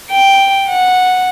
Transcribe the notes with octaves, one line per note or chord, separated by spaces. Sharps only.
G5
F#5